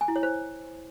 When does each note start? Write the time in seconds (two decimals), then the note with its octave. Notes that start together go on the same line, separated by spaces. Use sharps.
0.01 G#5
0.08 E4
0.16 C#5
0.23 C5